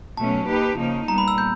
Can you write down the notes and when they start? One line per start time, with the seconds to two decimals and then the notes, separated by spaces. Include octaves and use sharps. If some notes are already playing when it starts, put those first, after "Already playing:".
0.17 B2 F#3 A3 C#4 A5
0.47 A#3 D#4 G4 B4
0.78 C#3 F3 A#3 D#4
1.08 A#2 G3 B3 A#5
1.18 B5
1.28 E6
1.38 G6